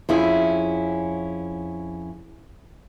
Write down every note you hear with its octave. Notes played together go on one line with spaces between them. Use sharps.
F2 C#4 E4 G#4